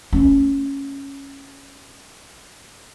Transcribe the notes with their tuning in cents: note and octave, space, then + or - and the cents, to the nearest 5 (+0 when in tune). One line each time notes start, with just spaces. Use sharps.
A3 +45 C#4 +0